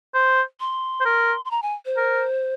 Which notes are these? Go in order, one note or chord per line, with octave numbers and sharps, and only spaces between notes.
C5
C6
C5
A#4
C6
A#5
G#5
C5
A#4